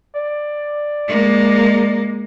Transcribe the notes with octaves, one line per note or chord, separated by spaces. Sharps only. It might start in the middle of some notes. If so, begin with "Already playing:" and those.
D5
G#3 A#3